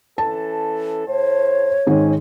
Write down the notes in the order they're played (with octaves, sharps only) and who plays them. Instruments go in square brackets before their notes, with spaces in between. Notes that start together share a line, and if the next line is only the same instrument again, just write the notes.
[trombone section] E3 C#4 A4 [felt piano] A5
[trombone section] A2 C5 [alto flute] C#5
[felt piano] G#2 D#3 [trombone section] G#3 C4 C#4